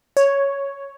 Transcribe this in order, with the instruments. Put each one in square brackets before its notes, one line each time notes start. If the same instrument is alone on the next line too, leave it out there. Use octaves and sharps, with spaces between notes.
[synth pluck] C#5